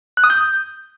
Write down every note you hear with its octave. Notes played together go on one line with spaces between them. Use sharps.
F#6
D#6
G6